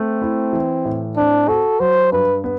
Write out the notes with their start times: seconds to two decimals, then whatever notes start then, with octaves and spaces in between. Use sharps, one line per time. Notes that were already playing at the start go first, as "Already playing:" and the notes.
Already playing: A3 C4
0.22 E4
0.53 E3
0.85 A2
1.17 C4 D4
1.48 F#4 A4
1.80 F#3 C5
2.12 G2 B4
2.44 B3